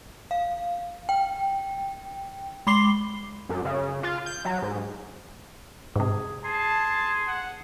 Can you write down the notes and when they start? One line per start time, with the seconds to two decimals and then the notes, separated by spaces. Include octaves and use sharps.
0.31 F5
1.09 G5
2.67 G#3 B5 C6 D6 C7 G7
3.49 F#2
3.65 C#3
4.03 F4
4.26 G6
4.45 F#3
4.62 G#2
5.96 G#2 C3 G#4
6.44 G#4 A5 C6
7.27 F#5